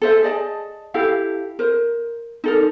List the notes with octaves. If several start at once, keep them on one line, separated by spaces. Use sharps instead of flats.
A4 C5 E5
G#4 D5 D#5 A5
E4 G4 A4 F5
A#4 C5
D#4 A4 A#4